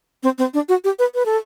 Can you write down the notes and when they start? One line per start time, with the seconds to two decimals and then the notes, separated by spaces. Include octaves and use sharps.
0.23 C4
0.38 C4
0.54 D4
0.69 F#4
0.84 G4
0.99 B4
1.15 B4
1.25 A4